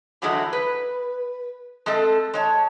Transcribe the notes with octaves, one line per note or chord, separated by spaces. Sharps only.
D3 E3 F#3 G#3 A3 E4
B4
G#3 A3 C4 A4
G#3 C#5 A5